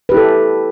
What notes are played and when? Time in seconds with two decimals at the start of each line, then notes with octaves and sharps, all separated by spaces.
0.09 B4
0.12 G4
0.14 E4
0.17 A4